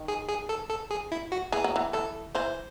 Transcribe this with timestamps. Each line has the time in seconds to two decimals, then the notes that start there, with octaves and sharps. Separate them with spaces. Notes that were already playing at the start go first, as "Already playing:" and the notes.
Already playing: D#3
0.08 G#4
0.29 G#4
0.49 A4
0.70 A4
0.91 G#4
1.12 E4
1.32 F#4
1.52 E3 G#4
1.64 F#3
1.76 E3
1.93 E3 A4
2.35 E3 C5